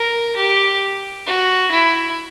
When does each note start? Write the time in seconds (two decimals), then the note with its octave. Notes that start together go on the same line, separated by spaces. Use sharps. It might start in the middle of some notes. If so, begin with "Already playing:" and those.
Already playing: A#4
0.37 G4
1.27 F#4
1.71 E4